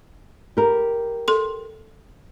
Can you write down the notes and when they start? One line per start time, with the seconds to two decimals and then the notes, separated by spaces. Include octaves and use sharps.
0.57 G4 A#4
1.28 A4 C6